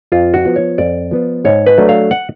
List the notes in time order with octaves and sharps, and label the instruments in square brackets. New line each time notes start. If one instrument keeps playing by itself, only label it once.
[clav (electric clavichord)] F2 F4
F#4
F3 B3 F4
C#5
F2 D5
F3 B3 F4
G#2 C#5
B4
F#3 A3 D4
F5
F#5